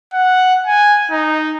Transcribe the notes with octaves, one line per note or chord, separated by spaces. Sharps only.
F#5
G#5
D#4